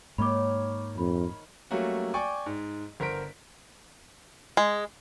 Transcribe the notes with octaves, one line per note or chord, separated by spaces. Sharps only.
G#2 D#3 A#3 C#5 B5 D6
F2 B5
F#3 G3 A3 A#3 C#4 F#4
D5 G5 G#5 C#6 D6
G#2
G1 A#4 C5 B6 D7
G#3